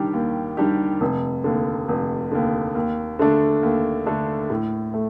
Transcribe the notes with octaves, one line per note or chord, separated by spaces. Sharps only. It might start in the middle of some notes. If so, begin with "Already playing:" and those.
Already playing: D#3 G3 D4 G4
D#2
D#3 G3 D4 G4
F1
D#2 D3
F1
D#2 D3
D#2
D3 A3 D4
D#2
D3 A3 D4
A2
A3